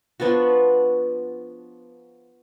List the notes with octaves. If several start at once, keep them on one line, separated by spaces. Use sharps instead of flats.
F3 B3 D4 F#4